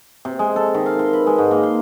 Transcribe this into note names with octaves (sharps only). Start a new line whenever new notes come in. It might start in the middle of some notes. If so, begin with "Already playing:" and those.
C3
G#3
A4
D#3
F5
C6
B4
G#3
G#2
A#3
C6